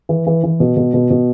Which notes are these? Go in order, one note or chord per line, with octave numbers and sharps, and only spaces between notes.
E3
E3
E3
B2
B2
B2
B2